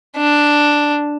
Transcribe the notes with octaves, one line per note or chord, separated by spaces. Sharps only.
D4